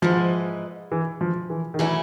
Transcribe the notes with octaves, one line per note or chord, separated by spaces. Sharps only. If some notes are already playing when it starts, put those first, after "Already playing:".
G#2 E3 F3 G#3
E3
F3
E3
D#3
E3 F#3 A3 C#4 E4